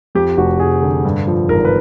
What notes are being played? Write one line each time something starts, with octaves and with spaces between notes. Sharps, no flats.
F2 G4
F1 F#4
F1 G#4
D3
G2
F3
G#1 A#4
B4